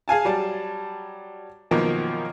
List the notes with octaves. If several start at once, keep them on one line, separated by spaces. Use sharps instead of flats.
G#4 F5 G#5 A5
F#3 G3 A5
F#2 B2 D#3 F3 F#3 A#3